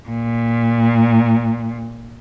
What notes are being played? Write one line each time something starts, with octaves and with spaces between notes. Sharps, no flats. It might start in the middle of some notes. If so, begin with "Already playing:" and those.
A#2